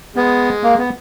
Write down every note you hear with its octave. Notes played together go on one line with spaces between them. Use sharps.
G#3 B3
A#3
B3